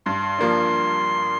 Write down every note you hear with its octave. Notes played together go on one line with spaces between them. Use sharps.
G2 C6
F3 A#3 D4